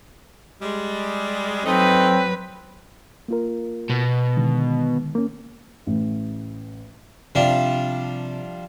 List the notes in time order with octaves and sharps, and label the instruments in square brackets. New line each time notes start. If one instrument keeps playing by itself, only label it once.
[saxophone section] G3 G#3
[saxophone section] F3 A3 D#4 [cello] F#3 B4 [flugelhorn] C4
[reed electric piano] A#3 F4 A#4
[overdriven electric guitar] B2
[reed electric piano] D3 D#3 G#3
A#3 C#4
[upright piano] A1
[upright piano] C3 [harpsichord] F3 G3 D4